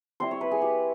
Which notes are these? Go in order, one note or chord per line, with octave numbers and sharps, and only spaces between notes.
G3 C4 E4 C5
C#5
B4
G#4
G4